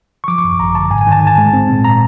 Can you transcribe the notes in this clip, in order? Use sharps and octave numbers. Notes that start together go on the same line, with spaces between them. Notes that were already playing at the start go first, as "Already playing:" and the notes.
C#6
F3 D6
C#6
F#2
G#1 A#5
D3 A5
G#2 G#5
G#5
D#3 A5
G#2 G#5
A5
G#3
C4
A#2
A#5